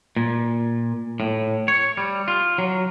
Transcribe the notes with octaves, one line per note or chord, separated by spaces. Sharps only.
A#2
A2
C#5
G3
F4
F#3